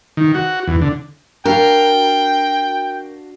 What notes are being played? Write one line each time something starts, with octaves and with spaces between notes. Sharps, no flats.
D#3
F#4
E2
D3
D4 F#4 A#4 F5 G5